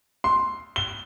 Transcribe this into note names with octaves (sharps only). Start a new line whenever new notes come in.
C6
G7